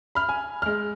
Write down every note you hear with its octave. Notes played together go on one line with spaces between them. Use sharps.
B5 F6
G#5
G#3 F6